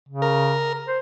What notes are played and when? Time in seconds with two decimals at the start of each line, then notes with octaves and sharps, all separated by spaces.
0.08 C#3
0.22 A#4
0.88 C5